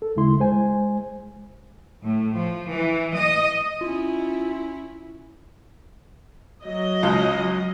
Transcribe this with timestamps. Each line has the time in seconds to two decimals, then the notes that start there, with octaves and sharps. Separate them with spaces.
0.02 A4
0.16 D#2 C#3 G#3 E4 C6
0.40 G#3 C5 G#5
2.03 A2
2.36 F3
2.70 E3
3.15 D#5
3.81 C#4 E4 F4
6.65 F#3 D#5
7.03 C#2 F3 G#3